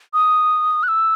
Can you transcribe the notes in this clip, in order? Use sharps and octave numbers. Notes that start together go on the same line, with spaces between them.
D#6
F#6
E6